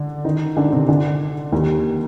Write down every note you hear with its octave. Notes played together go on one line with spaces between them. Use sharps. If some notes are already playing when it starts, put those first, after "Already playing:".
Already playing: D3 D4
D#3 D#4
D3 D4
C3 C4
D3 D4
D#2 D#3